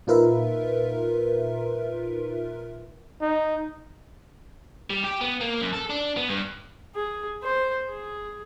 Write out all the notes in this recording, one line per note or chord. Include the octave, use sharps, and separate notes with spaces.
A#2 D#4 F4 A#4 B4 E5
D#4
G3
G4
B3
A#3
F#2
A4
D4
B3
G2
G#4
C5
G#4